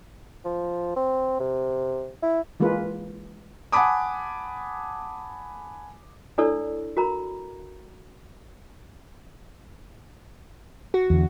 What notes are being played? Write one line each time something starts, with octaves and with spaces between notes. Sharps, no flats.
F3
C4
C3
E4
E3 G#3 A#3 F4 B4
F#5 G#5 A5 B5 D6 D#6
D4 E4 A4 C#5 D5 E6
F#4 A#4 A#5 B5
F#4
E2 D3